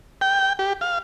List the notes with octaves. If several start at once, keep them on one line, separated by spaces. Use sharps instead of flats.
G5
G4
F5